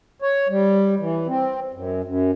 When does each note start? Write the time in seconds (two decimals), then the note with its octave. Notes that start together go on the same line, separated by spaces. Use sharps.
0.22 C#5
0.49 G3
0.99 E3
1.27 C4
1.73 F#2
2.04 F#2